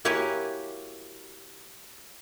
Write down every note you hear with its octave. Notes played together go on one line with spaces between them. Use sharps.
A#3 E4 F#4 G4 C#5 G#5